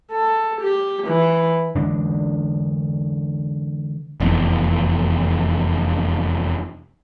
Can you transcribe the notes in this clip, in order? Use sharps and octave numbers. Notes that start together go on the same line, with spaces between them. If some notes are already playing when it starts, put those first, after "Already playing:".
A4
G4
E3
D3 E3 G#3 D4
F1 E2